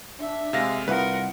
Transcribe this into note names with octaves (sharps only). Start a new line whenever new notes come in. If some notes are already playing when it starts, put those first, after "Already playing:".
D4 E5
C3 G#3 F5 A#6
C2 F4 A#4 B4 F#5